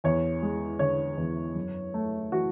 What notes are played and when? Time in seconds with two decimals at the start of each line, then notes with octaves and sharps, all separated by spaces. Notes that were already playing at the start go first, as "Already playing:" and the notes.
0.04 E2 C#5
0.42 G#3
0.79 D3 C#5
1.17 E2
1.55 F#2
1.94 A3
2.32 E3 F#4